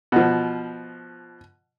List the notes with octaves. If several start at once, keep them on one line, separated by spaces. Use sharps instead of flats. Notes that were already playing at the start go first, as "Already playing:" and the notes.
B2 F3